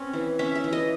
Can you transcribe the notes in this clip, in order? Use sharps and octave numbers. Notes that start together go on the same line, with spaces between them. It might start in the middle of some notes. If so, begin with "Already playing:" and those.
Already playing: C4 C#4
E3
C#4 E5
E5
E3
D#5